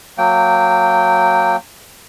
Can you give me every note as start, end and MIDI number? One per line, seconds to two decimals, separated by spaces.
0.18 1.56 54
0.18 1.56 58
0.18 1.56 79